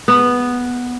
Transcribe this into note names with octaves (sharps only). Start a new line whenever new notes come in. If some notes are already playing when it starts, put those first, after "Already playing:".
B3